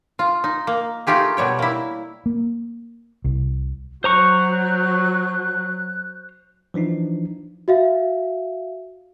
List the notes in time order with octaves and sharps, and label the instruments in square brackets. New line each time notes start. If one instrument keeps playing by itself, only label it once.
[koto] F4
D#4
A#3
A3 D#4 F4 G4 G#4
B2 G3 C#5 G5
A#3 E4
[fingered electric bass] A#3
C2
[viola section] F#3 [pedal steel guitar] C5 A#5 C#6 [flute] F#6
[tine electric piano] E3 F3 D4 D#4
[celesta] F#4 E5 F5